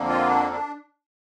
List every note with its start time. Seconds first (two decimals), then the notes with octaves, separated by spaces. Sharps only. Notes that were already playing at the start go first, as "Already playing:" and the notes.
Already playing: F2 D3 A#3
0.09 F4
0.27 D4
0.52 D4